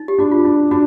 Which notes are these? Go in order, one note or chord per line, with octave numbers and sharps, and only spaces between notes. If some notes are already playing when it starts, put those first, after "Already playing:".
Already playing: D#4
G4
D4 F#4
F4
D4
D4 F#4